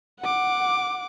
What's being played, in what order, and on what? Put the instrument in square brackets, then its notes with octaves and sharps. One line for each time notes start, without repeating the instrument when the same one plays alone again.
[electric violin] F#5 D6